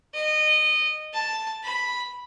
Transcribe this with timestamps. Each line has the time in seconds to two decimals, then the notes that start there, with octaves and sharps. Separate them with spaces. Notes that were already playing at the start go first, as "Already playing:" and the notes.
0.15 D#5
1.14 A5
1.64 B5